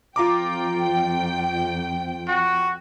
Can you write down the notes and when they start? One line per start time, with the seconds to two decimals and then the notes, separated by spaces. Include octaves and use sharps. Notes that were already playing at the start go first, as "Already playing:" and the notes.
0.16 F2 F4 G5 A#5 D6
2.28 F#4